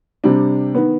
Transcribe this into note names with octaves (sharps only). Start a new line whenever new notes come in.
C3 G3 D4
D#3 B3